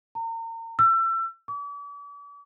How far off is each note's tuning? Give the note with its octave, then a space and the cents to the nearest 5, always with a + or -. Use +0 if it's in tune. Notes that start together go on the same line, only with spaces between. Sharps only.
A#5 -35
E6 +30
D6 -45